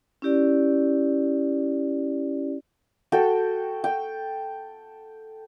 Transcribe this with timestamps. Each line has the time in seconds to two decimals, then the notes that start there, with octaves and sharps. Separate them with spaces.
0.22 C#4 E4 G4 D5
3.12 F#4 A4 G5
3.84 G5